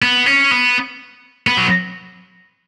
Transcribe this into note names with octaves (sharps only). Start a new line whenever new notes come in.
B3
C#4
B3
B3
F#3